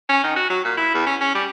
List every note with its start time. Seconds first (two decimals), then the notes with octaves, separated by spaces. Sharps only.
0.09 C#4
0.24 D#3
0.36 F#4
0.50 F#3
0.64 A#2
0.77 E4
0.94 E2
1.06 C#4
1.21 C#4
1.35 G3